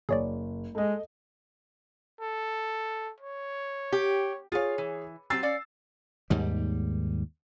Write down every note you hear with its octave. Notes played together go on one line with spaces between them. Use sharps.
F#1 G#4 C#5 D5
G#3 A4 D#5
A4
C#5
G4
F4 G#4 C#5 F5
E3
F#3 C4 G4 E6 A6 C7
C#4 D5 F5
D#2 G#2 G3